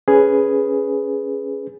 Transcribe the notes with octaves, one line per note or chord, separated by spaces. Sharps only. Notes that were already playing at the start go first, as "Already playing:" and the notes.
C#4 G#4 B4